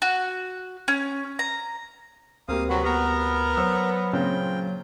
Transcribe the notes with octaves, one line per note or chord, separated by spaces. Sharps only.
F#4
C#4
A#5
D2 G3 A#3 C4 F5 D#6
C3 F#3 F#4 B4
B3 A#4 A#5
F#3 C5 E6
A#2 C#3 C4 F4 G5